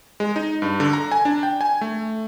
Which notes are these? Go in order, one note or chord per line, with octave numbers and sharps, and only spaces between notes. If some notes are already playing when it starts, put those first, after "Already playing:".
G#3
D#4
G2
D3
A#5
G#5
D4
G5
G#5
A3